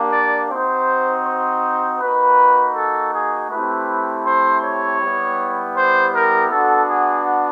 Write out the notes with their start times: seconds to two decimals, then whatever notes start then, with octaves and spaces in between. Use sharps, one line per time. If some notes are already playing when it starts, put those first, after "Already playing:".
Already playing: A#3 D4 G4
0.13 D5
0.50 C4 D#4 F#4 C5
1.26 C5
2.00 A#3 D#4 F#4 B4
2.75 A4
3.14 G#4
3.50 A3 C4 E4 G4 B4
4.26 C5
4.63 C#5
5.00 G3 B3 E4 G4
5.76 C5
6.14 A#4
6.50 B3 D4 F#4 A4
6.89 G#4